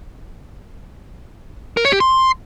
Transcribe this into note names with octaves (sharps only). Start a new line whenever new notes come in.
A#4
C#5
G4
C6